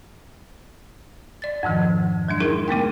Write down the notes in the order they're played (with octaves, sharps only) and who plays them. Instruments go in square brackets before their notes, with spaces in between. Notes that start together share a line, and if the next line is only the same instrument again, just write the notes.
[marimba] D5 A6
F2 G#2 D#3 F3
F#3 G#3 D4
D#4 E4 G#4 A#4
C#3 A3 B3 G5